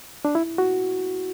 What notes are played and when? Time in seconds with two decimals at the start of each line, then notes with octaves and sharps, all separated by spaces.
0.25 D4
0.35 E4
0.58 F#4